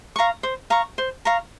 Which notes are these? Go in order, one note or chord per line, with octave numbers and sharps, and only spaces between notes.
F5 A#5 C#6
C5
F5 A#5 C#6
C5
F5 A#5 C#6